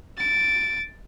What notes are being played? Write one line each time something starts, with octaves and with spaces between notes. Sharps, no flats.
A6 D7